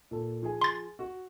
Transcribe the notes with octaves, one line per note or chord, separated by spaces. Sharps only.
A#2 A4
F3 G#4 G#5
C6 A6
F#4